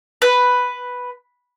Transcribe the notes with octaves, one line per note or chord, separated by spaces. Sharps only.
B4